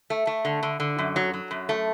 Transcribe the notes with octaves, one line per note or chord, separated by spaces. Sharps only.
A3
A3
D3
D3
D3
F#2
F#3
F#3
F#2
A3